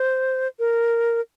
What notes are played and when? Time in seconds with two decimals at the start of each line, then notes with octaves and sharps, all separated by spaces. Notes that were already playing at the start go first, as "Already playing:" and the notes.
Already playing: C5
0.59 A#4